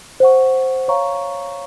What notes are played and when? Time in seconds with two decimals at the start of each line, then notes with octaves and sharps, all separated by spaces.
0.20 C5 F#5 C#6
0.88 C#5 F5 A#5 C#6